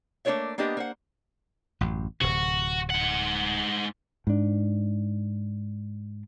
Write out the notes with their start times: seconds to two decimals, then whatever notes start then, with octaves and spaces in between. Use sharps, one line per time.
0.25 A3 A#3 D4 F4 C#5 E5
0.58 A#3 B3 D4 G4 D#5
0.77 A#3 C5 F#5
1.81 A1 F#2
2.21 D1 C3 F#4
2.90 G#2 F#5
4.27 G#2 D4